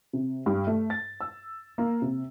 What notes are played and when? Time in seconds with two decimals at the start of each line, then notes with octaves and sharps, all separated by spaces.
0.13 C3
0.46 G2
0.67 A3
0.90 A6
1.21 E6
1.78 A#3
2.02 C3